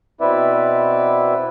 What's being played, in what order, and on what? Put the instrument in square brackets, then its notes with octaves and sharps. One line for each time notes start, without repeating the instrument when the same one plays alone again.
[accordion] B2 C4 E4 B4 D5 E5